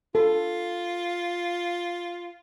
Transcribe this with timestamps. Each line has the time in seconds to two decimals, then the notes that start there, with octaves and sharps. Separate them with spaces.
0.15 F4 A4